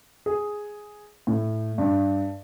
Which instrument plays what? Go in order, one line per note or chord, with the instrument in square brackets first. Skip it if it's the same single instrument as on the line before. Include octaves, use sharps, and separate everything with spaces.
[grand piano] G#4
A2
G2